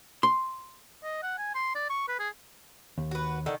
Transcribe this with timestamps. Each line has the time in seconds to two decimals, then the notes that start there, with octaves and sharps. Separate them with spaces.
0.23 C6
1.03 D#5
1.23 F#5
1.38 G#5
1.55 C6
1.75 D5
1.90 C#6
2.08 B4
2.19 G#4
2.98 D#2
3.11 F#4 B4
3.46 D3 D#3 A4